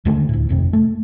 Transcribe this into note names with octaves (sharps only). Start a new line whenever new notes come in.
D#2 D3 G#3 A3
D2 A2
G#1 F2 C3
A3